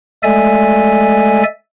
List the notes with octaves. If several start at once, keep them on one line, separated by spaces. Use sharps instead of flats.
G#3 A3 A4 D5 E5 G#5